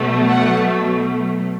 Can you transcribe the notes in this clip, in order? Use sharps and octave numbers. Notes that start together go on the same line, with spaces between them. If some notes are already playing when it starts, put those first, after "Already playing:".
Already playing: B2 F#3 A3
F#5